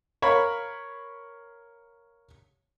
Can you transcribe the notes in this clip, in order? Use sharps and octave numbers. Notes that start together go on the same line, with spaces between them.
A#4 C#5 F5 B5